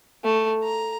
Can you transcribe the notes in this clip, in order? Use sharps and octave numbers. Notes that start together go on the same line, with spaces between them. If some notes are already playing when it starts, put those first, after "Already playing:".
A3
A#5